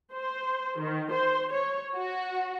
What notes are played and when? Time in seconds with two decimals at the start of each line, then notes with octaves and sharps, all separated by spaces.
0.13 C5
0.81 D#3
1.12 C5
1.53 C#5
1.95 F#4